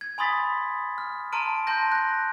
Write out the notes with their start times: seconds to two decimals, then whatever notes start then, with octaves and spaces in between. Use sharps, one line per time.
0.01 G#6
0.18 G#5 B5 C6 D#6 A6 B6
0.98 F6
1.32 A5 A#5 C6 F6 D7 D#7
1.67 A5 C6 G6 A#6
1.92 F#6 A#6